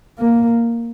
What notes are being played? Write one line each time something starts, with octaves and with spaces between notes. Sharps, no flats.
A#3